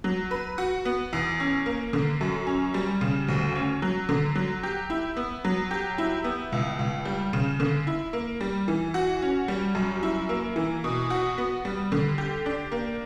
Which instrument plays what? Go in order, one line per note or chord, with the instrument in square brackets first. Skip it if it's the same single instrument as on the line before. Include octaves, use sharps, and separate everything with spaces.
[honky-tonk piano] F#3
B4
F#4
B3
E2
C#4
A#3
D3
F#2
C#4
G3
C#3
D2
C#4
F#3
D3
F#3
G4
E4
B3
F#3
G4
E4
B3
C#2
C#2
G3
C#3
D3
E4
A#3
G3
E3
F#4
C#4
G3
F#2
E4
A#3
E3
B2
F#4
B3
G3
D3
G4
D4
A#3